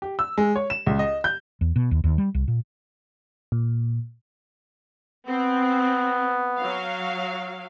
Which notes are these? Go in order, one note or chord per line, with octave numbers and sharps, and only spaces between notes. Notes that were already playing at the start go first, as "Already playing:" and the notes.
G4
E6
G#3
C#5
E7
C#2
D#5
G6
E2
B2
D#2
D#2
G3
C2
A#2
A#2
B3 C4
F#3 F5